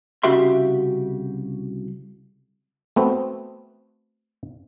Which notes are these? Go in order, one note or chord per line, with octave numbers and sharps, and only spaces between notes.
C2 C#3 F#4 G4 E5 C6
A3 B3 C4 F#4